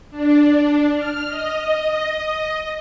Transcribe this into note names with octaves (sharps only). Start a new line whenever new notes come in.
D4
F6
D#5